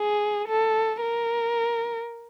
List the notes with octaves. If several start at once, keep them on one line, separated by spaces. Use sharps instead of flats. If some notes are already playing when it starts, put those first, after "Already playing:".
Already playing: G#4
A4
A#4